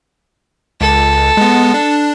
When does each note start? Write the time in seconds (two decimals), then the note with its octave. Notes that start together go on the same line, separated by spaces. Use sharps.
0.81 C#2 A4
1.37 G#3 B3
1.74 D4